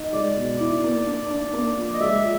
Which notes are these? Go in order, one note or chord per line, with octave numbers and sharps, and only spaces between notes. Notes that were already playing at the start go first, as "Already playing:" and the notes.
Already playing: D#4
G#3 D5
B2
E4
A#3
D4
D4
A#3
F3
D#5
G#3 E5
F3